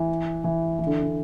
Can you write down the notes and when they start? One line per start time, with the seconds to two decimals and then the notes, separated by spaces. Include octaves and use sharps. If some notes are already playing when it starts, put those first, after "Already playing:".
Already playing: E3
0.44 E3
0.79 E3
0.87 D3
1.03 D3